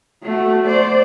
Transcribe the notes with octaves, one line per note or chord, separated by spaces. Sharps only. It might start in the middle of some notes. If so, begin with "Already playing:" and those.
A3 F#4
C5 D5